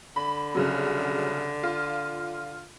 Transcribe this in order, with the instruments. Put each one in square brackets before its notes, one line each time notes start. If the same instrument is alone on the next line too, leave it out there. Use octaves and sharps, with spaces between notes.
[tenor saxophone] D3 [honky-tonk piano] B5
[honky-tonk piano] C2 C#3 F#3
F4